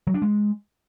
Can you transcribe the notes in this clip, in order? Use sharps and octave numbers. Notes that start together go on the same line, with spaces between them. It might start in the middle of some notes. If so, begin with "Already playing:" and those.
F#3
D4
G#3